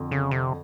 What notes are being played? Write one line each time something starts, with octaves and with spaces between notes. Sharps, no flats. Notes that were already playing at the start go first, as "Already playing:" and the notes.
Already playing: F2 D3
C#3
C3